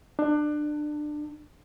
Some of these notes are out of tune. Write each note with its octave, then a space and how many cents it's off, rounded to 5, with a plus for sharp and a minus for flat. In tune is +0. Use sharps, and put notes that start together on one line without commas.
D4 +25